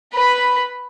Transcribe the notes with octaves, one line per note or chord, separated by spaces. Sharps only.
B4 B5